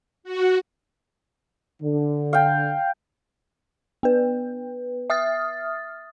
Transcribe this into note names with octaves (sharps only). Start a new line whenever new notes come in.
F#4
D3
F5 G5
B3 B4
E5 D#6 F6 A6